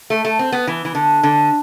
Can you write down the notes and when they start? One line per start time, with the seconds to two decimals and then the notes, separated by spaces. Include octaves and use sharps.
0.10 A3
0.25 A3
0.39 C4
0.52 B3
0.67 E3
0.85 E3
0.95 D3
1.23 D3